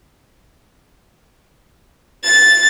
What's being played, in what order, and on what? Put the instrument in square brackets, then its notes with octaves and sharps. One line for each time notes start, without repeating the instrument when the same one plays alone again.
[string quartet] A6